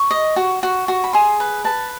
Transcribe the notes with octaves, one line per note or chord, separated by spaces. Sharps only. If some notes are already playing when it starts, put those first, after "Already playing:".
Already playing: C#6
D#5
F#4
F#4
F#4
B5
G#4 C6
B4
B4 A5